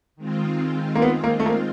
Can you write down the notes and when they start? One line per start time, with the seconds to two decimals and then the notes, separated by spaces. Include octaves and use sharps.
0.16 D#3 G#3 C4 F4
0.96 A#3
1.02 B3
1.24 A#3
1.40 A3
1.46 A#3